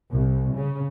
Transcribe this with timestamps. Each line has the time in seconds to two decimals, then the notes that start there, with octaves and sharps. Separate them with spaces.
0.11 C2
0.56 C#3